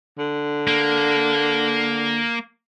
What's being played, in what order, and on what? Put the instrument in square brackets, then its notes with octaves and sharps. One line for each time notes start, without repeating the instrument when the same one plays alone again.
[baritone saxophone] D3
[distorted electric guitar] A#3